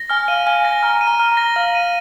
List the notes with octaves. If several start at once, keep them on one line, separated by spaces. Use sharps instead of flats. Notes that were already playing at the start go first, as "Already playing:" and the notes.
Already playing: A#6
G#5 F6
F5 D#7
G#5 F6
G#5 A#6
A#5 F6
D#7
A#5
F6
A#5
A#6
F5 F6
D#7